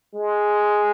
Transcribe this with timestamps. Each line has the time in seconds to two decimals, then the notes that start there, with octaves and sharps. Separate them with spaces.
0.15 G#3